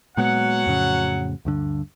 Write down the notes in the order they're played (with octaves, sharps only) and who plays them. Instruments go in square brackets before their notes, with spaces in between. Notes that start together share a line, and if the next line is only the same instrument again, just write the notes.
[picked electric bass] A#2 G#3 B3 [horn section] F#3 F#5
[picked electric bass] F2 A2 C#3
D2 G2 D3